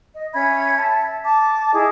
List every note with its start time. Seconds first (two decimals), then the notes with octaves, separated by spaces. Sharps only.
0.15 D#5
0.33 C#4 E5 B5 G#6
0.76 E5 A5
1.25 A5 D6
1.72 E4 G#4 D#5